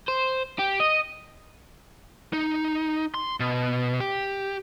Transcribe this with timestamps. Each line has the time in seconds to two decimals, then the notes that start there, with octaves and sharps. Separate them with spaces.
0.08 C5
0.59 G4
0.80 D#5
2.33 D#4
3.14 C6
3.40 B2
4.00 G4